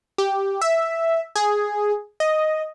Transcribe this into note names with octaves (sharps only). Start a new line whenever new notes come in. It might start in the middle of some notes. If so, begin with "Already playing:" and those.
G4
E5
G#4
D#5